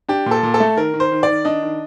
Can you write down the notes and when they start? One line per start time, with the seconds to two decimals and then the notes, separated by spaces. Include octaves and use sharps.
0.09 D4 G4
0.26 A#2 A4
0.43 A#2
0.54 A4
0.60 A3
0.77 D#3 A#4
0.94 D#3
1.00 C5
1.12 D#3
1.23 D#3 D5
1.45 D4 D#5
1.63 D#3